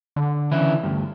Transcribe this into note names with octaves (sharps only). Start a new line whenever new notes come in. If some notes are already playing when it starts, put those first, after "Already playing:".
D3
C#3 E3 E4
D2 G2